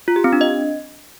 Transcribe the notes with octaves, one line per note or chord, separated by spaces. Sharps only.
F4
G4
C4
D4
D#5